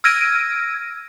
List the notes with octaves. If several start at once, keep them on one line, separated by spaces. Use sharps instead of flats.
E6 F6 G#6 A#6 D7 D#7